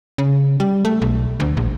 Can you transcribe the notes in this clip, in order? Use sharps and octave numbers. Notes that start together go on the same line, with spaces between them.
C#3
G3
A3
B1
D2
A#1